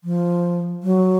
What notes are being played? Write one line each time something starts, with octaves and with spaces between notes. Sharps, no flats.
F3
F#3